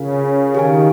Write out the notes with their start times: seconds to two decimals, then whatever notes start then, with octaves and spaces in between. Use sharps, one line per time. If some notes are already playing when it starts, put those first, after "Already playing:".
Already playing: C#3 F4 A#4 F5 G#5
0.55 D#3 G4 A#4 F5 G#5